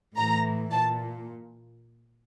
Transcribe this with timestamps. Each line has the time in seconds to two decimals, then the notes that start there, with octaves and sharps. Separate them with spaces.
0.16 A2 E3 A#5
0.72 A#2 A5